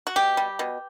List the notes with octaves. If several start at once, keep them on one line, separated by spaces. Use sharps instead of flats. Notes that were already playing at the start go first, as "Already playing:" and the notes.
F#4
B2 G4
G3
B2